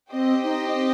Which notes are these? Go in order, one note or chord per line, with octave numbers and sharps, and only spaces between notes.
C4 G4 C5 D#5 G5
D#4
C4